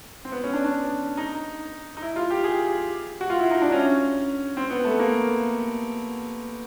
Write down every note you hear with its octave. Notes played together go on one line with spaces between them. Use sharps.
C4
B3
C#4
D4
D4
D#4
D#4
E4
F4
G4
G#4
F#4
F4
E4
D#4
D4
C#4
C4
B3
A3
A#3